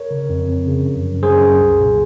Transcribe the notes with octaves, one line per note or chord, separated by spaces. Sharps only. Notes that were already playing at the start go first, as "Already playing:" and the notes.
Already playing: A#4 C#5
C#3
F2
F2
C#3
F#2
F#2
F#2 G#4 C5
F#2
C2
A#2